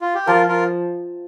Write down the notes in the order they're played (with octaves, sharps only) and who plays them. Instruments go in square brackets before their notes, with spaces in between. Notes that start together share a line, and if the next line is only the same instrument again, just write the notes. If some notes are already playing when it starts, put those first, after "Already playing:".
[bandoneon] F4
G4
[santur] F3 [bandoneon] F4 A#4
[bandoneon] F4 A#4